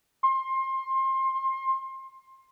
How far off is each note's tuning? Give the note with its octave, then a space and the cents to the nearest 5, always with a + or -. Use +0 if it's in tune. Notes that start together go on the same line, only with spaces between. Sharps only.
C6 +25